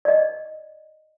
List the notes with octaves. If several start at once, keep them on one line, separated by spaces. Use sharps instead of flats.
D5 D#5